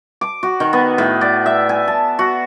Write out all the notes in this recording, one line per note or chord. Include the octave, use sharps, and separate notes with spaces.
D6
F#4
D#3
B3
A2
D5
E5
G#5
A5
F#4